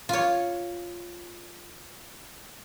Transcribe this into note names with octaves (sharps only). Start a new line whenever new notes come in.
F4 C#5